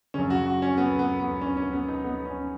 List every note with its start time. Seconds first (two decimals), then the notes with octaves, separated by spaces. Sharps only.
0.14 F#2 C#3 C#4
0.30 F#4
0.46 F#4
0.62 C#4
0.77 B3
0.99 B3
1.20 B3
1.42 C#4
1.57 C#4
1.73 B3
1.88 D#4
2.04 B3
2.25 C#4